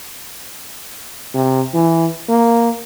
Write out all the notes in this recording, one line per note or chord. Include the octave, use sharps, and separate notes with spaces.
C3
E3
A#3